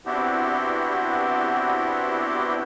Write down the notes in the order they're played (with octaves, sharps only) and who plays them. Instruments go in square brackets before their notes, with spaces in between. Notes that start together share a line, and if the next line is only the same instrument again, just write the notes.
[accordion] B3 C4 D4 E4 F#4 G4